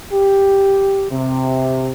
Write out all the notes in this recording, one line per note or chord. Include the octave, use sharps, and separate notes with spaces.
G4
C3